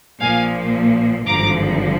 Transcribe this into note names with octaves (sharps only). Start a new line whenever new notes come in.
A#1 A#2 F3 A#3 F5 G#5
G#1 G2 D3 F3 A#5 D6